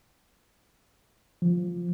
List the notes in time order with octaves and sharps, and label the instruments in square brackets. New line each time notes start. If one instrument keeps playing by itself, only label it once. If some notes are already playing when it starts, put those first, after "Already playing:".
[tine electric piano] F3